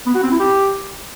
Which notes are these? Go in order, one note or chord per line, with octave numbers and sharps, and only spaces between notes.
B3
F#4
C4
E4
G4